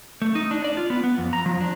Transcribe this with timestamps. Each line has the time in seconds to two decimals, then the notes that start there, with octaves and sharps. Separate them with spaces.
0.22 A3
0.35 D#4
0.51 D4
0.64 D5
0.77 F4
0.90 B3
1.04 B3
1.18 F2
1.33 A#5
1.46 F3
1.61 D4